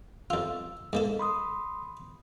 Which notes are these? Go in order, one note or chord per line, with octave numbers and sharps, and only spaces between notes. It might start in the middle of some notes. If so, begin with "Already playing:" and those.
F2 F4 E6
G#2 A#3 A4
B5 C6 D#6